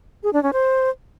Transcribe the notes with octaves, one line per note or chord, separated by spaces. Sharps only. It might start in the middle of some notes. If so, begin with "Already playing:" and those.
G#4
D4
C#4
C5